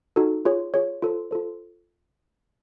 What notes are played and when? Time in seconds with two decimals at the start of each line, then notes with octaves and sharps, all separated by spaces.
0.16 D#4 F#4 A4
0.45 F4 G#4 C#5
0.74 F4 G#4 C#5
1.02 F4 A4 C5
1.31 F4 A4 C5